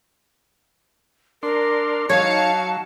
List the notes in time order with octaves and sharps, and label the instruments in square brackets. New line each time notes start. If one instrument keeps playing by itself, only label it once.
[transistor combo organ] D4 C6 [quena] A#4
[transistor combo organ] F#3 [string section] D#4 F5 C#7 [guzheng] C#5 [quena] A5